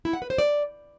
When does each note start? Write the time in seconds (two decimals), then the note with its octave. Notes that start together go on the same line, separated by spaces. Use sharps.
0.05 E4
0.13 F#5
0.22 B4
0.30 C5
0.38 D5